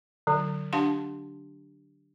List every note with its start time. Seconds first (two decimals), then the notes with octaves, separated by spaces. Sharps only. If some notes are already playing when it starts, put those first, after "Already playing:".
0.27 D3 F#3
0.73 D4 G4 F5 F#5 A5 C6